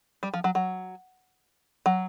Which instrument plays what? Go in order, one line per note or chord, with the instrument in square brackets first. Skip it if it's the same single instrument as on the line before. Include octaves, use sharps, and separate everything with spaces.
[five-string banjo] G3
F3
F#3
F#3
F#3